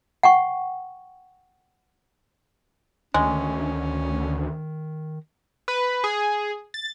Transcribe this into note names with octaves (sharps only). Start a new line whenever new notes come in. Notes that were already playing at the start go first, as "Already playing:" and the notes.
F#5 G5 C#6
D2 D#3 G#3 C#4
B4
G#4
A6